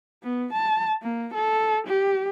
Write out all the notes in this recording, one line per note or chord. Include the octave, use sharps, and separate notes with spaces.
B3
A5
A#3
A4
G4